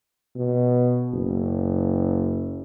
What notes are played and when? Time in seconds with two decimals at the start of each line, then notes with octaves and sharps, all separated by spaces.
0.36 B2
1.13 F#1